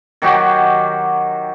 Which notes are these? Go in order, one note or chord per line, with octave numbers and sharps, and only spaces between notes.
D#3 F#3 F#4 G4